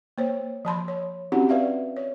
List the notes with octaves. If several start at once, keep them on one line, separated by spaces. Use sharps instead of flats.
A#3 C5 C#5
F3 A5 B5 C6
C#5
C4 C#4 E4 F#4 G4 F#5
B4 D5 E5 F5
C#5